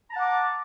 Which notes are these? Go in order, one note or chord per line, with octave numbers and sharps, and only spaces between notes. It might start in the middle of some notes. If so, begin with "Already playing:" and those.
F#5 A5 A#5 D6